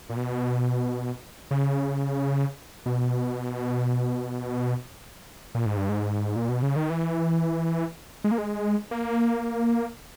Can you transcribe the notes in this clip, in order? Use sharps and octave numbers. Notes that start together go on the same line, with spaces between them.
A#2
B2
C#3
B2
A#2
G#2
G2
G#2
A#2
B2
C#3
D#3
E3
G#3
A#3
G#3
A#3